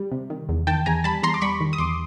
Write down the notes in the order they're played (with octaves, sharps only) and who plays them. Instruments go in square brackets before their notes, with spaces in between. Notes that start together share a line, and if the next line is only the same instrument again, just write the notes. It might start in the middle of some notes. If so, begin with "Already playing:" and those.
Already playing: [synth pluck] G3
C3
D#3
E2
D#3 G5 A5
E2 G#5 A#5
G3 A5 B5
E2 A#5 C6
D6
G3 B5 C#6
D#3
D#6
E2 C6 D6